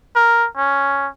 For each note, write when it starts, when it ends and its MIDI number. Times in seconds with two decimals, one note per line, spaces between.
0.16 0.47 70
0.57 1.08 61